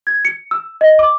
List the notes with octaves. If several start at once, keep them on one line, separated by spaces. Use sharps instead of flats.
G#6
C#7
E6
D#5
D6